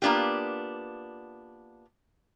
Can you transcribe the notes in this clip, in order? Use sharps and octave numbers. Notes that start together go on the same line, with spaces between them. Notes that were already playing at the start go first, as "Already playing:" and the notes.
A#3 B3 D4 F4 G4